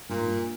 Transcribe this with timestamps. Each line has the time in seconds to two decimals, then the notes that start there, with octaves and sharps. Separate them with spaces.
0.09 G2 A#2
0.19 G#2
0.27 G2